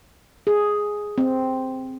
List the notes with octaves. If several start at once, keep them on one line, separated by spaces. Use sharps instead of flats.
G#4
C4